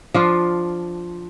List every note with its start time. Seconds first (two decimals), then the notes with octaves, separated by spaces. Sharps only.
0.14 F3 D4 F4